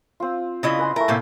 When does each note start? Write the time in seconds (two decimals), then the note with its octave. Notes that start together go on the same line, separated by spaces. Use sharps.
0.20 C4 F4
0.63 C#3 E4 D#5
0.79 B4 G#5 C6
0.96 A3 E4 A#4
1.08 A2 C3 A#3